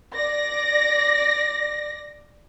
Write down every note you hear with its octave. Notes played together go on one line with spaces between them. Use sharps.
D5 A#6